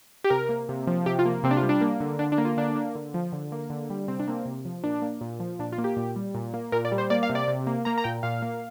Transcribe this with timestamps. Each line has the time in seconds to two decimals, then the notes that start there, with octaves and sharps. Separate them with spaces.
0.24 G4
0.30 C3 A#4
0.49 A#3
0.69 C3
0.87 F3
1.06 C3 G4
1.19 F4
1.25 A#3
1.43 C3 C4
1.51 D4
1.57 F4
1.63 G3
1.69 D4
1.81 A#3
2.00 D3
2.19 D3 D4
2.32 D4
2.38 A#3
2.45 F4
2.57 D3 D4
2.75 A#3
2.95 D3
3.14 F3
3.32 D3
3.52 A#3
3.70 D3
3.90 G3
4.08 C3 C4
4.19 D4
4.27 A#3 C4
4.46 C3
4.65 F3
4.84 A#2 D4
5.02 A#3
5.21 A#2
5.40 F3
5.59 A#2 D4
5.72 F4
5.78 A#3
5.84 G4
5.97 A#2
6.16 G3
6.35 A#2
6.54 A#3
6.72 A#2 A#4
6.85 D5
6.92 G3
6.98 C5
7.10 A#3 D5
7.23 F5
7.30 C3
7.35 D5
7.48 C3
7.67 A#3
7.85 A#3 A#5
7.98 A#5
8.04 A#2 G5
8.23 A#2 F5
8.42 A#3